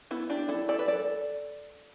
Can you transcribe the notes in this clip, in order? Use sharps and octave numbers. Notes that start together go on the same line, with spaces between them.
B3 E4
D4 G4
E4 A4
A4 D5
B4
A4 D5